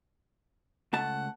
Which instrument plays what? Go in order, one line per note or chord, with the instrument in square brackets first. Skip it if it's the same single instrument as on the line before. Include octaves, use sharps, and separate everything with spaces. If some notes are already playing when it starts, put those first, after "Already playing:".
[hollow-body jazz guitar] C#2 A3 A5 [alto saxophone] F#5